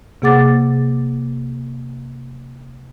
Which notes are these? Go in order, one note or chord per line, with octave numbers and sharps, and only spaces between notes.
C3 A#3 G#4 F#5 D6 A6